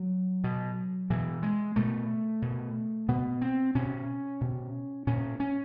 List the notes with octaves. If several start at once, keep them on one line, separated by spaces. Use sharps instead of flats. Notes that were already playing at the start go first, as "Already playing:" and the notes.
Already playing: F#3
B2
B2 E3
G#3
B2 A3
B2
B2 B3
C4
B2 C#4
B2
A#2 C#4
C#4